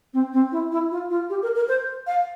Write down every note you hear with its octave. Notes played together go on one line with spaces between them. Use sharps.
C4
C4
E4
E4
F4
F4
G4
A#4
A#4
C5
F5